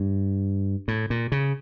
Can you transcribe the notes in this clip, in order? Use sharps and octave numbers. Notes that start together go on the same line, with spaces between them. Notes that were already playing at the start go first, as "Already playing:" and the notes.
Already playing: G2
A2
A#2
C#3